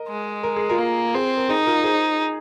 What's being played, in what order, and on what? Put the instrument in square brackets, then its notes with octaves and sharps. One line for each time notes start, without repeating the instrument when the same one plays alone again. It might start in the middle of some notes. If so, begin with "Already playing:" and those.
Already playing: [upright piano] A#4 D#5
[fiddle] G#3
[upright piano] A#4
G#4
F4 A#4
[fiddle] A#3
[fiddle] C4 [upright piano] G#4
[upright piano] A#4
[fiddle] D#4 [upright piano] G#4
[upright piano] F4 A#4
G#4 C5